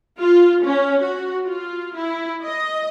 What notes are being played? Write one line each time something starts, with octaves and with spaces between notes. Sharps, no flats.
F4
C#4
F#4
F4
E4
D#5